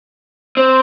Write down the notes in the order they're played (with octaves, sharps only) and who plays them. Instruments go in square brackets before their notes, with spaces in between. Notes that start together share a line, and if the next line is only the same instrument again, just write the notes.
[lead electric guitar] C4